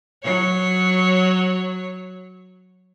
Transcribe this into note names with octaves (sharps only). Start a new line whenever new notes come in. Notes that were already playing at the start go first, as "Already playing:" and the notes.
F#3 C#5